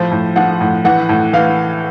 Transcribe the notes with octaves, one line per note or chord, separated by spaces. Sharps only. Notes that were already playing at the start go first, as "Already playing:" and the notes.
Already playing: A2 F3 C5
A2
F3 F#5
A2
E3 F#5
A2
E3 F5